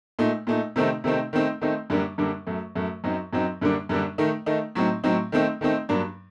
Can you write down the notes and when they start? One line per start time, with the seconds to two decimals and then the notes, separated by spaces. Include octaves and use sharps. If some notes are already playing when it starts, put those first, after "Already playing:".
0.19 A#2 A3 D#4
0.47 A#2 A3 D#4
0.76 C3 D#3 A3 C4 D#4
1.04 C3 D#3 A3 C4 D#4
1.33 D#3 A3 C4 D#4
1.61 D#3 A3 C4 D#4
1.90 F#2 D3 G3 A#3 D4
2.18 F#2 D3 G3 A#3 D4
2.47 F#2 F#3 A3
2.75 F#2 F#3 A3
3.04 F#2 F#3 C4 D#4
3.33 F#2 F#3 C4 D#4
3.61 F#2 D3 G3 A#3 D4
3.89 F#2 D3 G3 A#3 D4
4.18 D#3 A3 D#4
4.46 D#3 A3 D#4
4.75 A2 F#3 C4 D#4
5.04 A2 F#3 C4 D#4
5.32 D#3 A3 C4 D#4
5.61 D#3 A3 C4 D#4
5.89 G2 F#3 A#3 D4